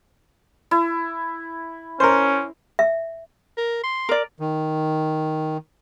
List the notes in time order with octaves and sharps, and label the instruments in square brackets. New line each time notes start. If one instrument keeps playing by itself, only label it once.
[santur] E4
[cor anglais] C#4 [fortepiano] A#4 C5
[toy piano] E5
[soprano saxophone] A#4
C6
[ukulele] A#4 D5
[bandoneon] D#3